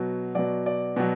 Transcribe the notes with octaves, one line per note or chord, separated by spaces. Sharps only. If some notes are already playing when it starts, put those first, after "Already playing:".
Already playing: B2 F#3
B2 F#3 D5
D5
B2 F#3